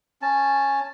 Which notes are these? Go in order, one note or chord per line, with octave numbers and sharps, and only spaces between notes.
C#4 A5